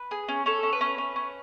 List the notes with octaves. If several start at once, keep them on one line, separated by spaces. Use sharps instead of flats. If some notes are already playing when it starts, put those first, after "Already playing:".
Already playing: B4
G#4
C#4
C#4 A4
C#4
B4
C#4
C#4
C#4